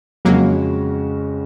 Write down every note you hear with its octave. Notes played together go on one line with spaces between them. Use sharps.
F2 C#3 F#3 G#3 A#3 C#4 F#4